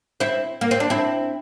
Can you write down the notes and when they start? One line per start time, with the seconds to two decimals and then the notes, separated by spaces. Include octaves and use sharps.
0.20 C4 E4
0.61 A#3
0.71 C4
0.80 D4
0.90 C4 E4